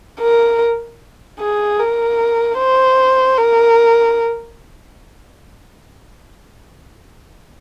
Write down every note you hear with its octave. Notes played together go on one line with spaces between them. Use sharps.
A#4
G#4
A#4
C5
A#4